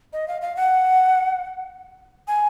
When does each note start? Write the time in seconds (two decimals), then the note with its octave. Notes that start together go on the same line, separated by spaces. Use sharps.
0.13 D#5
0.28 F5
0.42 F5
0.56 F#5
2.28 G#5